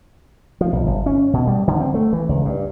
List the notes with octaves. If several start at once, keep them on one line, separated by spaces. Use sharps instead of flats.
F3
B1
G1
C#4
B2
G3
D3
C4
A3
E3
C#2
G2